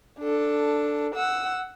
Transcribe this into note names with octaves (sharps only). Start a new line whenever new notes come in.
D4 A4
F#5 E6